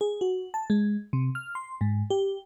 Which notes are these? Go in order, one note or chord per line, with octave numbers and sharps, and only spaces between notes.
G#4
F#4
A5
G#3
C3
F6
C6
G#2
G4